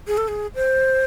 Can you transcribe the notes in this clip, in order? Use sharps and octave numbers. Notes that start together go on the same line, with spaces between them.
G#4
A4
G#4
C5